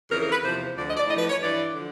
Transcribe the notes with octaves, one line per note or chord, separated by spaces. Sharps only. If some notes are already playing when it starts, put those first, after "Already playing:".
F2 C#3 E3 A#4
A#4
B4
E2 C3 F3 C5
D2 D3 F3 D5
D#5
D5
A2 D#5
F3
B4
C#5
G2 E3 D5
D3 F3